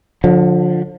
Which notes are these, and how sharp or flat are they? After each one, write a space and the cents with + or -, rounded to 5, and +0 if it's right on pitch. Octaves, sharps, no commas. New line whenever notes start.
D3 +0 F3 +35